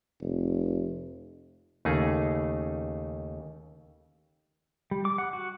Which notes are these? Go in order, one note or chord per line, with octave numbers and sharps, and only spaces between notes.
F1
D#2 C#3 A3 D#4 G#4
G3
D6
F#5
F#4